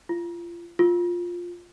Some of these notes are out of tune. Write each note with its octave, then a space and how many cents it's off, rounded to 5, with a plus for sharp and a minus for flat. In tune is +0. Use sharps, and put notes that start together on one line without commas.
F4 -30
F4 +5